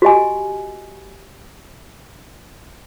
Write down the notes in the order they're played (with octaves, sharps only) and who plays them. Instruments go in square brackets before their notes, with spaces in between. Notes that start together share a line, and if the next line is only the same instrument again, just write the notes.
[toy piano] F#4 G4 D#5 G#5